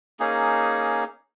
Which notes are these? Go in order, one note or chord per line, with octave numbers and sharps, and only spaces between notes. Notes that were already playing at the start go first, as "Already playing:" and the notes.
A#3 C#4 D#4 G#4